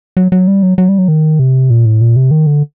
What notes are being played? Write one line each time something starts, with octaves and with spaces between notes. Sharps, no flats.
F#3
F#3
G3
F#3
F#3
G3
F#3
D#3
C3
A#2
A2
A#2
C3
D#3
D3